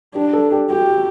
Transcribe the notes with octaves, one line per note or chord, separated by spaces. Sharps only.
D4 G4
A4
G4
F#4 G4